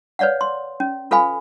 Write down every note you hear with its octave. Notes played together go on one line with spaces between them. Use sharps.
B4 C#5 D5 F5 F#5
C6
C#4
F4 A4 B4 F5 G#5 B5